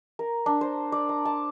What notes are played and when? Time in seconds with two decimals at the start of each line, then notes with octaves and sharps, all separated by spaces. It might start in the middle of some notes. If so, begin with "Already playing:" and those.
0.19 A#4
0.46 D4
0.61 C5
0.92 D5
1.09 A#5
1.25 A5